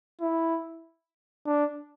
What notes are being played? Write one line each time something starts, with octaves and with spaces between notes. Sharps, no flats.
E4
D4